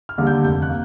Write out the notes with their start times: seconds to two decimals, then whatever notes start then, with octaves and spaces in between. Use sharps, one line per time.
0.09 F6
0.18 D#2 D3 G3 A#3
0.27 G6
0.44 F1 G6
0.62 F#6
0.70 A#3